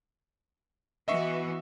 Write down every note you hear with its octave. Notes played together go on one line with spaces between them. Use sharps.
E3 B3 F#4 D#5 E5 C#6